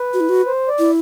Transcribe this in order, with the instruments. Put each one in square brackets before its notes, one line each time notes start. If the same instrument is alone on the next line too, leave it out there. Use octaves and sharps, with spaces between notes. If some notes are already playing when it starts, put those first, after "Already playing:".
Already playing: [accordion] B4
[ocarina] F#4
E4
F#4
[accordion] C5
D5
[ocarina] E4